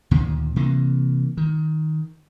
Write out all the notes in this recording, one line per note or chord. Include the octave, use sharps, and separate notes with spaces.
D2 A#2 D#3
C3 E3 A#3
D#3